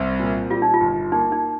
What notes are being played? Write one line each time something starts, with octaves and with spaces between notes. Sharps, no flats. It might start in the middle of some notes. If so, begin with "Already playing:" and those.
Already playing: C2 C4
A#2
G3 F4
D#4
F4
G1
A#3 D#4
D#4